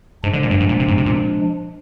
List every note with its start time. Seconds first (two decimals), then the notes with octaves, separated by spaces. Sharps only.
0.24 G#2 F3 G#3 D4
0.33 D3
0.43 A#2
0.51 G2
0.60 G#2
0.69 A#2
0.80 C3
0.88 G#2
0.98 C3
1.06 A#2